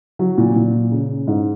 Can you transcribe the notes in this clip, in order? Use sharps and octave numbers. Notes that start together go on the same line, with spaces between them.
F#3
A#2
A#2
C#3
G#2